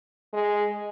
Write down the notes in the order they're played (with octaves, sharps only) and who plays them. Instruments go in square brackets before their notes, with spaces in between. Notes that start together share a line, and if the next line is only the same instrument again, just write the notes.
[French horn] G#3